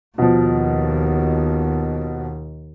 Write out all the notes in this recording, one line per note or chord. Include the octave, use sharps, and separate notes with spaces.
D#2 B2 F3